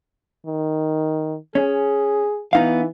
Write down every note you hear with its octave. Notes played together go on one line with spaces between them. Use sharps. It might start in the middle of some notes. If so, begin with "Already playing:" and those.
D#3
C#4 G#4
E3 B3 D#4 F5